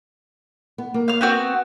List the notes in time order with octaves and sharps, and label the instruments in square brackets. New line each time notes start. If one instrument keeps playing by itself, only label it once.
[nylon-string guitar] B3
A#3
[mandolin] F5 F6
B3 C4 F#4